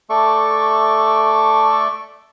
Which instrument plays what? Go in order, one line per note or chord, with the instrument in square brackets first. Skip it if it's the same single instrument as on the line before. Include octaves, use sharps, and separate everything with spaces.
[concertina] A3 A4 D5 E5 C#6